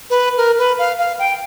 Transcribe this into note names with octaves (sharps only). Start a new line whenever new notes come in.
B4
A#4
B4
F5
F5
G5